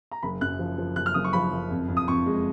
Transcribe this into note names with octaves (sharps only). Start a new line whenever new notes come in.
A#5
F#1 B5
F#2 F#6
F3
F3
F#1 F#6
F6
F#1 D#6
C#6
F3 B5
F#1
F2
F2
D#6
F2 C#6
G#3